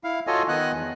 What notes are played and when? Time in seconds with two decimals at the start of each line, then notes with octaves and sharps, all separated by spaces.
0.04 E4 F5
0.27 F4 F#4 A4 C#5 D#5 G#5
0.49 D#3 B3 D#5 F#5 G#5 F#6
0.72 E2